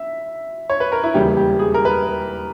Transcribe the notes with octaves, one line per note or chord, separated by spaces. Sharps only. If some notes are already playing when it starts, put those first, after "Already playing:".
Already playing: E5
C#5
B4
A#4
E4
E1 D#2 C#3 E3 G3 G4
G4
G#4
A#4
B4
A#4